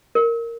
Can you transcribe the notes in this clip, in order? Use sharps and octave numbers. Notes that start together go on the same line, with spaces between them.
A#4